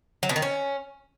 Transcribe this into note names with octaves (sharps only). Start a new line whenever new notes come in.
F#3
B2
D#3
C#4